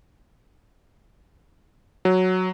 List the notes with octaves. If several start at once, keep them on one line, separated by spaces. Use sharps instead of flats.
F#3